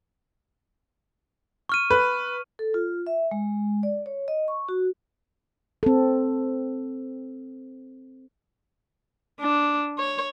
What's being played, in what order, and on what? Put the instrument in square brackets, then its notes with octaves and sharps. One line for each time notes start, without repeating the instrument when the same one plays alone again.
[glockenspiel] C#6 F6 D#7
[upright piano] B4
[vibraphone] A4
F4
E5
G#3
D5
C#5
D#5
C#6
F#4
[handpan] C4 A4
[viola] D4
C#5